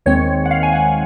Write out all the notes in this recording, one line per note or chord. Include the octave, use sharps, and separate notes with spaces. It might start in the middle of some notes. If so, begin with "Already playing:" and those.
D#2 D#3 G#3 C4 C#5
F#5
F5
G#5
F#5